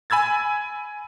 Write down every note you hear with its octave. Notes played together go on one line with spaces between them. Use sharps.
G#5 B5 E6 G#6 A6